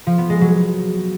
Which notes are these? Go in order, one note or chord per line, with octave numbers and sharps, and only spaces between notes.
F3
B3
G#3
F#3